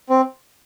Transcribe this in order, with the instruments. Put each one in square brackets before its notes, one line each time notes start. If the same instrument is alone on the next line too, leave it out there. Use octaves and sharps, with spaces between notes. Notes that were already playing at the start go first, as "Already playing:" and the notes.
[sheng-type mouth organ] C4